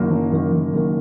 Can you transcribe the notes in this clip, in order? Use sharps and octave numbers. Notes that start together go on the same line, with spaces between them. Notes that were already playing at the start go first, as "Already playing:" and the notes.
Already playing: F#1 F#2 D#3 A#3
F#1
F#2 D#3 A#3
F#1
F#2 D#3 A#3